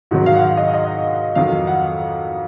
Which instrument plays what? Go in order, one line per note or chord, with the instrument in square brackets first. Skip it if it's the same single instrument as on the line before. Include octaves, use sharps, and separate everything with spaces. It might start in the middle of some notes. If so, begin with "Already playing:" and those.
[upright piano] G#2 D#3 F#3 F#4
F5
F#5
F5
D#5
D#5
F2 D#3 F#3 F5
F#5